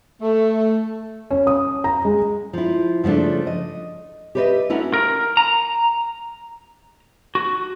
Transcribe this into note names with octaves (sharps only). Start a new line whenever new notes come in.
A3
C#4
D#6
A#5
G#3
F3 E4
C#3 F3 G#3 A3 D4
D#5
G4 G#4 B4 C#5 D#5 E5
A3 C#4 E4 F#4 A#4
A#4
A#5
F#4